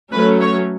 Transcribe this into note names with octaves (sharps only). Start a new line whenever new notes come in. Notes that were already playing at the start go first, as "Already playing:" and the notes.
F#3 A3 C#4 B4
C#5